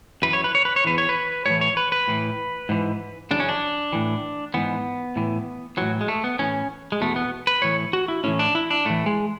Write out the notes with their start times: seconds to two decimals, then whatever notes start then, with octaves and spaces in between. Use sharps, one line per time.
0.22 F#2 E3 B4
0.33 C#5
0.44 B4
0.55 C#5
0.65 B4
0.76 C#5
0.85 E2 C#3 E3 B4
0.98 C#5
1.09 B4
1.46 A2 E3 C#5
1.61 C#5
1.77 B4
1.92 B4
2.08 A2 E3
2.69 G#2 E3
3.31 F#2 C#3 E3 D4
3.40 C#4
3.49 D4
3.93 A2 E3
4.54 G#2 E3 B3
5.16 A2 E3
5.77 A2 E3 F#3
6.01 G#3
6.08 A3
6.24 B3
6.39 A2 E3 C#4
6.92 G#3
7.01 E2 B2 A3
7.16 B3
7.47 B4
7.62 A2 E3 C#5
7.93 F#4
8.08 E4
8.24 A2 E3 C#4
8.39 D4
8.55 E4
8.71 D4
8.85 A2 E3 A3
9.06 G#3